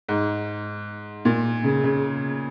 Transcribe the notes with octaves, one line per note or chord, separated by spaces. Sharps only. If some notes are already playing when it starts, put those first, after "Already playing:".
G#2
A#2
C#3
C#3